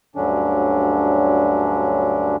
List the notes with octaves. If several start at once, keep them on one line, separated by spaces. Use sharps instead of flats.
D2 G2 D3 F#3 C#4 D4